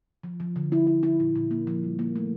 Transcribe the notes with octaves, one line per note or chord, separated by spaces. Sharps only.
F3
F3
D3
E4
E4
E4
A#2
A#2
A#3
F3
G3
A#3
A3